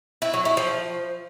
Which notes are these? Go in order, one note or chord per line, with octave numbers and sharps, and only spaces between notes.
E4
F#3
E4
F3